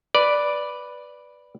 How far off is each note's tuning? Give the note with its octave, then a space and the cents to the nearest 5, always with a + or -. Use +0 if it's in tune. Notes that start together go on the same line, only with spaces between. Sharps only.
B4 +0 D5 +0